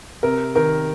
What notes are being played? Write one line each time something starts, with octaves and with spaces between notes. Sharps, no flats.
C3 A#4
D#3 A#4